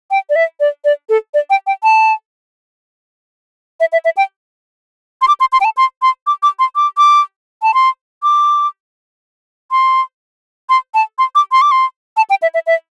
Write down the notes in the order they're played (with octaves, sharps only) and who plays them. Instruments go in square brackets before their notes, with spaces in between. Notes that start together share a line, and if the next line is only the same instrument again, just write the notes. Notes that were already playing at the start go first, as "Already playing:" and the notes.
[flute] G5
D5
E5
D5
D5
A4
D5
G5
G5
A5
E5
E5
E5
G5
C6
D6
C6
C6
G5
A5
C6
C6
D6
D6
C6
D6
D6
A5
C6
D6
C6
C6
A5
C6
D6
C6
D6
C6
A5
G5
E5
E5
E5